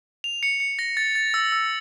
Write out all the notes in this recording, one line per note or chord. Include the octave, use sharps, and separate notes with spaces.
F7
C#7
C#7
A#6
A6
A6
E6
E6